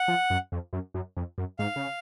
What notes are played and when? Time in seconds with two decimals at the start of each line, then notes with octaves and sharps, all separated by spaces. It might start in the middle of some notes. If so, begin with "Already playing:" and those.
Already playing: F#5
0.08 F3
0.30 F#2
0.52 F2
0.73 F#2
0.94 F#2
1.17 F2
1.38 F#2
1.59 G#2 F5
1.76 C#3